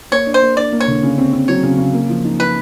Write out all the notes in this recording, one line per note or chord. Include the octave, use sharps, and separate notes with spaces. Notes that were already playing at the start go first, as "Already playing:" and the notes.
A#3 C#5
D4
C5
A#3
D4 D5
A#3
C#5
D3
C#3
C4
C4
F#3 C#5
C#3
C#3
A#3
F3
D#4
D#4 B4